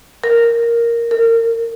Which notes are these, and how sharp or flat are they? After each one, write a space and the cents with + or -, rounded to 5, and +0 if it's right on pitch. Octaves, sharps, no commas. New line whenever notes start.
A#4 +0
A#4 -25